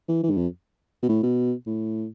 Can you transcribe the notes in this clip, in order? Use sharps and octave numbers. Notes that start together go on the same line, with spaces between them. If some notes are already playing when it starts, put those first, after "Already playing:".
E3
E3
G2
F2
B2
A2
B2
A2